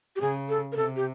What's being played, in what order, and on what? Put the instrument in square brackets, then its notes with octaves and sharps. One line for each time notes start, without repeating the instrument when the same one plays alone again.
[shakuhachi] G4
[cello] C#3 [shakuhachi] G#4
[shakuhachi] A4
A#4
[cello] C3 [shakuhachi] A4
[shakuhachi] G4